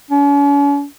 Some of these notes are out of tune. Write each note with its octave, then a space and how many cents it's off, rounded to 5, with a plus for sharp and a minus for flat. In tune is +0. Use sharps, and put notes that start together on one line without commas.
C#4 +45